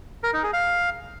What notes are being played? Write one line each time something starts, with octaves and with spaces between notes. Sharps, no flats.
A#4
D#4
G#4
F5